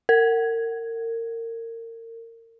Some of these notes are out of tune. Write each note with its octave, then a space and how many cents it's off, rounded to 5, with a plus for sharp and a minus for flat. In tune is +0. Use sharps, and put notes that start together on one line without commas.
A#4 -30